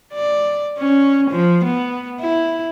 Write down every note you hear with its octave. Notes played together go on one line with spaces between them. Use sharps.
D5
C#4
F3
B3
E4